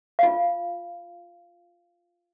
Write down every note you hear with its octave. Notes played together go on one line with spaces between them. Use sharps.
F4 F5